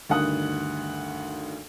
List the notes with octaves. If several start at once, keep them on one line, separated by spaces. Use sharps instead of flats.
D2 G2 D#3 F#5 D#6 F#6